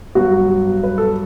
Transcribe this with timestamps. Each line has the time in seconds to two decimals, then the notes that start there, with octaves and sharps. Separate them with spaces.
0.15 G2 F#3 B3 F#4
0.84 B4
0.98 A4